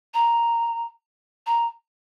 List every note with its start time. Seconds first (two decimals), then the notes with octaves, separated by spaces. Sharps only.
0.14 A#5
1.46 A#5